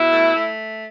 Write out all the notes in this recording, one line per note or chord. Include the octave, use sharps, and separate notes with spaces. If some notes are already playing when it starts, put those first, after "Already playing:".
Already playing: B2 E4
A3
A3